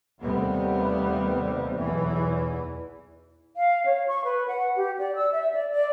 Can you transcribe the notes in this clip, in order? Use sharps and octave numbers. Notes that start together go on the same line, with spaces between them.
D#2 C3 G3 A3 B3
B1 E2 E3
F5
C#5
C#6
B4
F#5
G4
D5
E6
E5
D5
D5